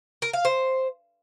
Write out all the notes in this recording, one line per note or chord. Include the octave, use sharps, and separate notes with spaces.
A#4
F5
C5